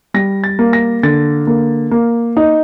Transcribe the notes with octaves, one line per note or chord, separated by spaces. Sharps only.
G3 A#6
A6
A#3
A#6
D3 A6
A#3
A#3
D#4